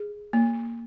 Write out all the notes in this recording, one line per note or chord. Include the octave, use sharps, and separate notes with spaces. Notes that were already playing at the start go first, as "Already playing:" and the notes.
Already playing: G#4
A#3